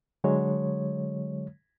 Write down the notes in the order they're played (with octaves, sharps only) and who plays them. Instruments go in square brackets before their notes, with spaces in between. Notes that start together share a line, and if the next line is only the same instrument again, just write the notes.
[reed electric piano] D3 F#3 G#3 C#5